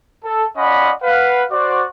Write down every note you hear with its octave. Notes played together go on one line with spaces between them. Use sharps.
A4
C#4 F4 D5 D#5 F#5 B5
B4 F5 F#5
F#4 C5 D5